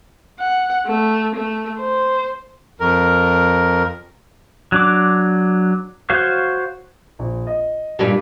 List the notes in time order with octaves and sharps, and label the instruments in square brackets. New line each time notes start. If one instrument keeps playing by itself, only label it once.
[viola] F#5
A3
A3
C5
[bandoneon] F2 A#4
[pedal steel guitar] F#3 D4 D6
F#4 C5 C#5 F5
[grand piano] A#1
D#5
[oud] G2 A#2 G3